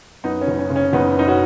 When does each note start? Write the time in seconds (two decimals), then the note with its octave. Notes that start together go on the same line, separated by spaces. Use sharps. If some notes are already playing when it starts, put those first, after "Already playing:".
0.24 F#2 B3 D#4
0.41 C#4
0.47 F#1
0.59 C#4
0.70 C#3
0.76 C#4
0.93 F#1 B3 D#4
1.16 F#2 D#4
1.28 C#4 F#4